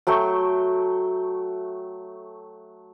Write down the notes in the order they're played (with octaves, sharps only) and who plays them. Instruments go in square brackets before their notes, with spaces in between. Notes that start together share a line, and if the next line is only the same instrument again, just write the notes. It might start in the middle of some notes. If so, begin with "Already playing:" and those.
[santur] F#3 A3 G5 C#6